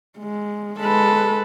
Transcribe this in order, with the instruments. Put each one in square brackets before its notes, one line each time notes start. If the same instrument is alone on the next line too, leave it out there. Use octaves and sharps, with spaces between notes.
[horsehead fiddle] G#3
[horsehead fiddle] G#3 B4 [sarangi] A4